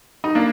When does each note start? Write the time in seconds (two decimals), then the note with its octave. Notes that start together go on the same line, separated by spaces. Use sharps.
0.24 D#4
0.35 A#3 D4